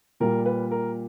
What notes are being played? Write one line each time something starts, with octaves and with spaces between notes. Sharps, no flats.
A#2 G3 A#4
B4
A#4